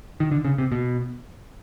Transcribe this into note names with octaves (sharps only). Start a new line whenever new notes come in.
D#3
D3
C#3
C3
B2